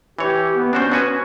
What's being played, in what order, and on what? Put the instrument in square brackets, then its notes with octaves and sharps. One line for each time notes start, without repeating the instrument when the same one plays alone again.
[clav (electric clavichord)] E3 C#5 [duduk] G4
[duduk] B3
[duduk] C#4 [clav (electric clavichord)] D4 F#4 C5
[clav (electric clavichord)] B3 F#4 G#5